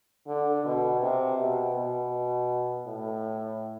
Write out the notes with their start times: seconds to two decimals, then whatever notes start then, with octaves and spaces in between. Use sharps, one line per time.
0.28 D3
0.65 B2
1.02 C3
1.39 B2
1.76 B2
2.87 A2